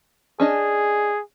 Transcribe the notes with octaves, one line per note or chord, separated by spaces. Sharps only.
C#4 D4 G#4 D#5